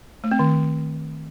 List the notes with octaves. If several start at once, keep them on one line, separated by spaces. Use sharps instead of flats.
A3
C4
D#3